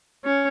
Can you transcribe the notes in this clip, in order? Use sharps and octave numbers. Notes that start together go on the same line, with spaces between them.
C#4